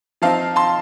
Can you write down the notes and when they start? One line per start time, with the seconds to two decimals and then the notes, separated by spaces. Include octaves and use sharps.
0.22 F3 C4 D#4 F5 A5
0.56 A5 C6